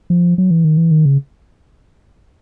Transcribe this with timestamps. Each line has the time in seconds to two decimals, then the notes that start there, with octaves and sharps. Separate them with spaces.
0.10 F3
0.38 F#3
0.51 E3
0.64 D#3
0.77 E3
0.91 D#3
1.05 C#3